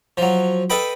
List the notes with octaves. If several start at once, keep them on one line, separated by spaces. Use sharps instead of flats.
F3 F#3
A4 B4 D#5 G5 B5